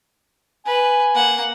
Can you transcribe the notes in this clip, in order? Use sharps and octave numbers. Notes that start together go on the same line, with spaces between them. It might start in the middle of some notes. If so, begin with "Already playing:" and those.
B4 G#5
A#3 F#5